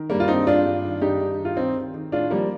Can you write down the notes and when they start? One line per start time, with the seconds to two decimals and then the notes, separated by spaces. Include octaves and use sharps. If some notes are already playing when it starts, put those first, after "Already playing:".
Already playing: D#3
0.10 G2 G3 A#3
0.20 F4
0.28 G2 C4 D#4
0.47 G2 D4 F4
0.65 G2
0.84 D#3
1.02 G2 D#4 G4
1.21 G2
1.39 D#3
1.45 F4
1.57 D#3 C4 D#4
1.76 D#3
1.94 D#3
2.12 A2 D4 F4
2.31 F3 G3 A#3